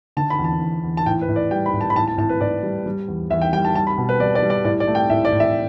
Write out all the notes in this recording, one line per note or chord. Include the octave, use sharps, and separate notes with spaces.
D3 A5
B5
E2
A5
E2
E2
A5
A2 G5
B4
A2
D5
G3 G5
B5
A2
A5
B5
A2 A5
A5
A2 A5
B4
A2 D5
G3
G3
E2
E2 E5
G5
G3 G5
A5
G3 A5
B5
B2
B4
G3 D5
D5
G3
D5
A2 D5
D5
A3
G5
A2 E5
D5
A2
E5